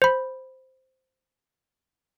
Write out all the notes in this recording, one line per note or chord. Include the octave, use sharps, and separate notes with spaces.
C5 B5